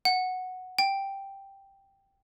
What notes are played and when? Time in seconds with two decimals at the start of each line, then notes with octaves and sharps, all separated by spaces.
0.05 F#5
0.79 G5